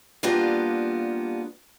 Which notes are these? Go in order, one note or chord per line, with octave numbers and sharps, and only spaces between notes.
G3 A#3 B3 D4 F4 G4